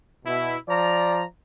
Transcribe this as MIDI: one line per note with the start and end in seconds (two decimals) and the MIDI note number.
0.25 0.56 47
0.25 0.56 64
0.69 1.23 53
0.69 1.23 74
0.69 1.23 82